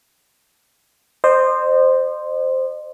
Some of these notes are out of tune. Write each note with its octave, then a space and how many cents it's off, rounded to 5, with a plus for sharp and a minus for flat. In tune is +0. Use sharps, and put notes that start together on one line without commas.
C5 +0 D#5 -40